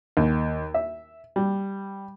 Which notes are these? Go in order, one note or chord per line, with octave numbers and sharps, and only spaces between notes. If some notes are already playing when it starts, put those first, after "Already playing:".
D#2
E5
G3